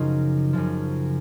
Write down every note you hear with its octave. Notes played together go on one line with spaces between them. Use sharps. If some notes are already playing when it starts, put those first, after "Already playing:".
Already playing: F#2 C#3 F3 D#4 F4
F#2 C#3 F3